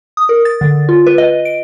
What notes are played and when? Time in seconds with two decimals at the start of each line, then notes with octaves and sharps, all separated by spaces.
0.17 D#6
0.29 A#4
0.45 A6
0.61 D3
0.89 F4
1.06 B4
1.18 D#5
1.45 D7